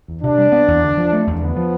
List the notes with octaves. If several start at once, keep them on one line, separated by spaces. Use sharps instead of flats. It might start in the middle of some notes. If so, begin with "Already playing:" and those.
E2
C3 D4
G3
B3
E2
D3
F3
A3
E2
D3 B3
F3